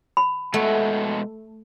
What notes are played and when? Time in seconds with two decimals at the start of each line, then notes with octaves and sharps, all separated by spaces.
0.17 B5
0.54 B2 G#3 A3 F#5